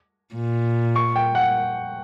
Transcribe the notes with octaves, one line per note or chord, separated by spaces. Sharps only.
A#2
C#6
G5
F#5